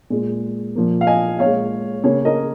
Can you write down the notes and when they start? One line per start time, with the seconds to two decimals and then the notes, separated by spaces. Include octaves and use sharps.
0.10 A#2 G#3
0.76 A#2 F3 A#3
1.01 F5
1.07 D#5 G#5
1.39 A#2 G#3 C#5 F5
2.04 C#3 A#3 G#4 C#5
2.25 A#4 D#5